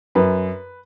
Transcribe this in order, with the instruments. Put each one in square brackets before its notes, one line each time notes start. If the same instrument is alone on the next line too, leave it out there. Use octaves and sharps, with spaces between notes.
[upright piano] F#2 B4